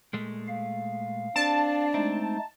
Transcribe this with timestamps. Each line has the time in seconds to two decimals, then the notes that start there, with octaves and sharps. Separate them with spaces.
0.13 A#2 G#3 A3
0.48 F5
1.36 C4 D4 A5
1.94 G#3 A3 C4 D#4